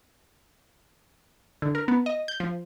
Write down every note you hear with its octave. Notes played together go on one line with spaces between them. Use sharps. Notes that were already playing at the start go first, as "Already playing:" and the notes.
D3
A#4
B3
D#5
G6
F3